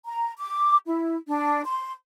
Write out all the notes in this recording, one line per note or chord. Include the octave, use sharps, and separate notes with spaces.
A#5
D6
E4
D4
C6